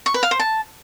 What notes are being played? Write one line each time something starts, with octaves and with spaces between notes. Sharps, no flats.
C#6
B4
F5
C5
A5